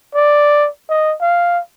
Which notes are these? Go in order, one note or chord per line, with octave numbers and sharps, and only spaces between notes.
D5
D#5
F5